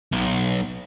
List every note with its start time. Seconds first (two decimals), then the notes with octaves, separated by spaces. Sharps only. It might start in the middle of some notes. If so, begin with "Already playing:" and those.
0.13 B1